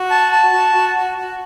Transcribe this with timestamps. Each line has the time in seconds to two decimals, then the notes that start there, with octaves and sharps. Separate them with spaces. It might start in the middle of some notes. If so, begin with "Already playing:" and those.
Already playing: F#4
0.10 A5
0.32 A5
0.53 F#4
0.75 F#4
0.96 F#4
1.17 F#4